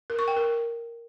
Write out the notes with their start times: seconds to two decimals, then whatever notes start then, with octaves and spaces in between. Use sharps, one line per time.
0.10 A#4
0.19 C#6
0.28 G5
0.37 A#4